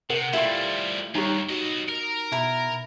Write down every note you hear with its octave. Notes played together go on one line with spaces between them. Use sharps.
C3 A#4 F#5
F3 G3 A3 E4 F4 G4 A4 C6
D#2 G3 D#4 G4 C#5 A#5
F#3 F#4 D#5
A#4
B2 E4 A#5 B5